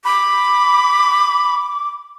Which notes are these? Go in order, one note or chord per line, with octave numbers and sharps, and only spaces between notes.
B5 D6